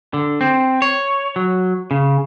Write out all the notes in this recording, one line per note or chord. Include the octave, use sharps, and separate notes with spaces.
D3
C4
C#5
F#3
C#3